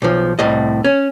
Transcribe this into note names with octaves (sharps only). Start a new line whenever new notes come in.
B1 F3
C2 A2 D#5
C#4